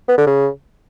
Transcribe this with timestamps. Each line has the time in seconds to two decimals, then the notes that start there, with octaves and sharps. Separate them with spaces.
0.08 B3
0.17 D3
0.27 C#3